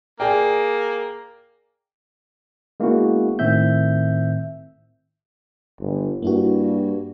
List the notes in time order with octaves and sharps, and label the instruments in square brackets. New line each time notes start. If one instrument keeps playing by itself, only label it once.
[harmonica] A#3 [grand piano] G#4 D5 G5
[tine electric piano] G#3 A#3 B3 C#4 E4 F#4
A2 D#3 C4 E5 G6
[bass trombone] G1
[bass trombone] G2 [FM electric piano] A#3 E4 F#4